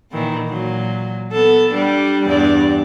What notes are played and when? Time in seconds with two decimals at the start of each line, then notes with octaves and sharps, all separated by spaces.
0.11 A#2 D#3 E3
0.48 A#2 F#3
1.32 B3 A4
1.71 G3 D4
2.26 E2 G2 D5